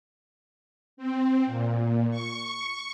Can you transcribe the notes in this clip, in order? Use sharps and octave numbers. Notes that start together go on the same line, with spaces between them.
C4
A#2
C#6